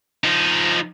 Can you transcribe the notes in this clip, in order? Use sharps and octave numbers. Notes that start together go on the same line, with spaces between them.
F3 D#4